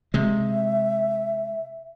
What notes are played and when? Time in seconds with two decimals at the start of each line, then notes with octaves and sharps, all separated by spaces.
0.14 C3 G#3 E5